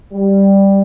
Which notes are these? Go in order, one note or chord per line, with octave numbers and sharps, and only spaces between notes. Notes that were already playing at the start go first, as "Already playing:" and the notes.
G3